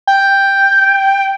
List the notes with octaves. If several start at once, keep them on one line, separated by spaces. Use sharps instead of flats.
G5